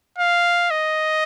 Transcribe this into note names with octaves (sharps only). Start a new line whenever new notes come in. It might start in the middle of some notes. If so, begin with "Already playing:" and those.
F5
D#5